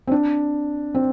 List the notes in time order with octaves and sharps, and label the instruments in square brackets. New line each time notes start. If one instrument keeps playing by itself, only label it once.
[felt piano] C4
D4
C4